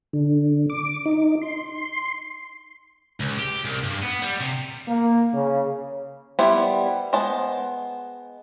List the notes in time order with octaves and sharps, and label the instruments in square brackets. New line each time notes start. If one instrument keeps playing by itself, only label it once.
[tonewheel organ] D3
D6
D#4
C6
[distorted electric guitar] C#2
G4
C2
G2
B3
G3
C3
[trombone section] A#3
C#3
[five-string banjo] G3 B3 E4 B4 C5
G#3 B3 C5 A5